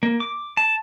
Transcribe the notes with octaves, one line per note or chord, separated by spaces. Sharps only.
A#3
D6
A5